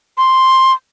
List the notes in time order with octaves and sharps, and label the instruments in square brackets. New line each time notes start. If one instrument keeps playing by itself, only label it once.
[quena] C6